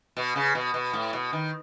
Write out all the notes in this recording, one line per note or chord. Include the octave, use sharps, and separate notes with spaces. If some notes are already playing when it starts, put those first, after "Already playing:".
B2
C#3
B2
B2
A2
B2
D#3